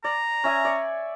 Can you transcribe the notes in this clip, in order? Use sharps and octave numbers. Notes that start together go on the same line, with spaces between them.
D5 A#5
C#4 E5 G#5
D5 C#6